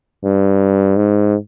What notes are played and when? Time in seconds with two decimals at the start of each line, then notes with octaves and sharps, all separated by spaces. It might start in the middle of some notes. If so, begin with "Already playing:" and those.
0.24 G2
0.97 G#2